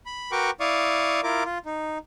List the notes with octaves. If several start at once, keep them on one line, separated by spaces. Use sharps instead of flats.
B5
F#4 A#4 B4 G5 C#6 D6
E4 D5 F5 C#6 D#6
E4 F4 A#4 D6
F4
D#4